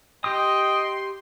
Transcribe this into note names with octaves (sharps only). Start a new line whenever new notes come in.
G4 D#5 G5 C6 D#6